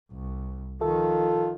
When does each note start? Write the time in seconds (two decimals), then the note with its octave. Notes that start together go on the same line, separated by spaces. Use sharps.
0.12 C2
0.81 D#3 F3 F4 A4